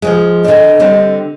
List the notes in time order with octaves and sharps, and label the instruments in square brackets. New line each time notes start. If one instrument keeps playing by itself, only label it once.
[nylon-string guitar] F3 F#3 G#3
[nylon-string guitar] D3 D4 [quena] D#5
[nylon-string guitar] D3 G3 C4